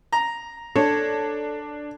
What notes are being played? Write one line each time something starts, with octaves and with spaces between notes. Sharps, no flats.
A#5
D4 A4 C#5